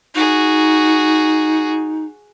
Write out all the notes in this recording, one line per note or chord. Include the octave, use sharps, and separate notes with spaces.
D#4 F#4 G#4